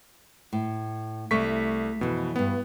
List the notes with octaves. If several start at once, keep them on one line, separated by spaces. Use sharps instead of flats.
A2
C2 A3 C#6 B6
F2 B2 E3
D2 G2 B3